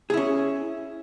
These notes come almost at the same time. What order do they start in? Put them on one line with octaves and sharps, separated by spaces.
G#4 E4 C#4